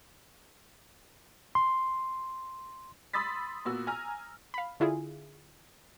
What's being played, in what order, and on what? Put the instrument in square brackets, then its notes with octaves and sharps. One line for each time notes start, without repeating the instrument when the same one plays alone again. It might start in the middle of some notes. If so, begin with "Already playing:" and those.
[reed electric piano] C6
[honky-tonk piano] B5 C6 D#6 E6 A6 B6
A#2 B3 F#4 E6
G#5 A#5 F6 A#6
[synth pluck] F5 B5
D3 E4 F4 G#4